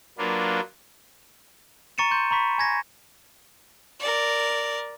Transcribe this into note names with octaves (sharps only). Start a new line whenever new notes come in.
F#3 A#3 D4 F4 B4
A#5 C#6 A6 C#7 D#7 E7
C6 G6
A#5 B5 C#6 B6
G#5 G#6 A#6
A#4 D5